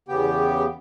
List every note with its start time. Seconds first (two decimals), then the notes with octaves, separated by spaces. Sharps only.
0.09 E2 C#3 B3 G4 G5